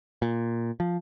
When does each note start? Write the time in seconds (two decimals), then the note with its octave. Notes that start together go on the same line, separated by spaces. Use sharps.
0.22 A#2
0.80 F3